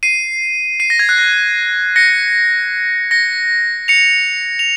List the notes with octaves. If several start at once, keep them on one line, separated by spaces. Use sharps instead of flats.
C7 D#7
C7 D#7
A#6
G#6
F#6
A#6
A#6 C#7
A#6 C#7
C#7 F7
F7